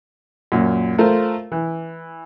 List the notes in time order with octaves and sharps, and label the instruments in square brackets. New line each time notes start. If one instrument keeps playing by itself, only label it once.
[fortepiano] F#2 A#2
A3 F4 A#4 C5
E3